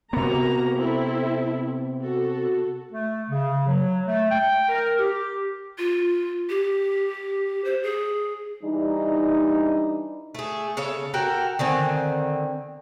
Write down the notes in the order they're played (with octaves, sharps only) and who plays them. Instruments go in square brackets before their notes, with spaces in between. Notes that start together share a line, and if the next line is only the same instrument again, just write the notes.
[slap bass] C3 B3 [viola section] A#3 F#4 A#5
[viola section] C4 E4 A4
F#4 A4
[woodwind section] A3
C#3
F#3
A3
G5
A#4
G4
[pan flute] F4
G4
C5
G#4
[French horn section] E3 G3 D4 D#4
[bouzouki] A3 G#4
C#3 A4 C#5 F5
F#4 A4 A#4 G5
D3 D#3 C4 G#5